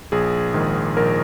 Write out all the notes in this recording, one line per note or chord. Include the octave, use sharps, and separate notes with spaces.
A#1 G#4
G#2 D#3
A#1 A#4